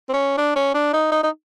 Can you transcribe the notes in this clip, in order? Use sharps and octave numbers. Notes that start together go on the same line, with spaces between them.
C4
C#4
D4
C#4
D4
D#4
D#4
D#4